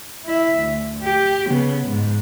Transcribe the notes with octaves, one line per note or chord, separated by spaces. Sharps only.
E4 E5
D2
G4
C#3 B3
G#2